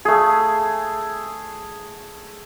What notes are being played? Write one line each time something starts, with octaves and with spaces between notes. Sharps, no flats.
A3 G#4